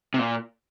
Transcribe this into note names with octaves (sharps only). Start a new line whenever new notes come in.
C3
A#2